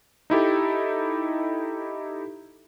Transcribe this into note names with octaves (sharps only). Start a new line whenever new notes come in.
D#4 E4 G4 A4